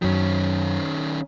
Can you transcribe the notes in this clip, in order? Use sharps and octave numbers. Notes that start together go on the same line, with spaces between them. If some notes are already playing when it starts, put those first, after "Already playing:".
F#2 D#3 F#3 C#4